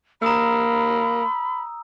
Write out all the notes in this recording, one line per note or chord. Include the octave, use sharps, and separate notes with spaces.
A#3 A#5 B5 D#6 E6